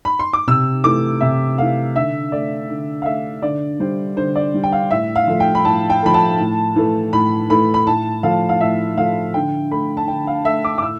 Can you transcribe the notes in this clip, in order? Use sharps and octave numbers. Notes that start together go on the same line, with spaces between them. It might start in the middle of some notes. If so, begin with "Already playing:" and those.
B5
C6
D6
C3 E6
E3 A3 D6
C3 E5
E3 A3 F5
D3 E5
A3 D5
D3
F5
A3 E5
D3 D5
G3 C5
D3 C5
D5
G3
G5
F5
A2 E5
F5
F3 A3
G5
B5
A2 A5
G5
F3 A3 B5
A5
A2
E3 A3
A2 B5
E3 A3 B5
B5
A2 A5
F3 A3 F5
F5
A2 E5
F3 A3 F5
D3 G5
A3 B5
A5
D3 G5
F5
A3 E5
D6
D6
A2 E6